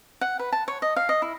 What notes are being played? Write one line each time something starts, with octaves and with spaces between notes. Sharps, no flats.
F#5
B4
A5
C#5
D#5
F5
D#5
E4